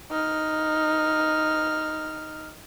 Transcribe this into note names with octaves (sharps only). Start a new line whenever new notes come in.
D#4 F6